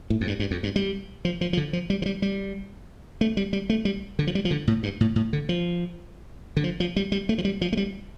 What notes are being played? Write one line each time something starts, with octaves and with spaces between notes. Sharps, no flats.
A2
F2
G2
G2
F2
G2
G3
F3
F3
F3
D3
F3
G3
F3
G3
G3
A3
G3
G3
A3
G3
D3
F3
G3
F3
D3
A2
G2
A2
A2
D3
F3
D3
F3
F3
G3
G3
A3
F3
G3
F3
A3
G3